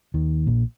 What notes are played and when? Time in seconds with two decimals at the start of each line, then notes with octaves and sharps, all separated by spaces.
0.14 D#2 D#3
0.47 A#1 A#2